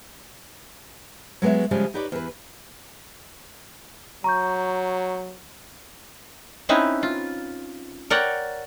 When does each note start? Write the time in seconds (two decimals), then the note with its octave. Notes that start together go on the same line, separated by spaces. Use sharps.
1.42 F#3 G#3 B3 C#5 E5
1.71 C#3 F3 G3 G#3 C#4
1.94 D#4 G4 B4 C#5 D5
2.12 E2 B4
4.24 F#3 A#5 C#6 G6
6.69 C4 C#4 D#4 E4 B4
7.03 F4
8.10 A#4 C#5 D5 F#5 G5